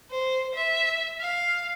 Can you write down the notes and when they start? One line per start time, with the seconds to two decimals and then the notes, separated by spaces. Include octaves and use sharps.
0.11 C5
0.55 E5
1.20 F5